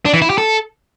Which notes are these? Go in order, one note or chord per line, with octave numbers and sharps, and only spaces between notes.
D4
E3
E4
G4
A4